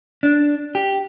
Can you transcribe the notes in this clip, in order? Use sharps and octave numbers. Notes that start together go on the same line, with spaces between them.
D4
G4